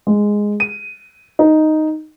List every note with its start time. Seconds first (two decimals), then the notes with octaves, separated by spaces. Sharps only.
0.07 G#3
0.60 D#7
1.39 D#4